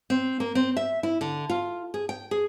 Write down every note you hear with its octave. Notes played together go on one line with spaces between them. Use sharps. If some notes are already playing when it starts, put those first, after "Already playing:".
C4
A#3
C4
E5
E4
D3
F4
G#4
G5
G#4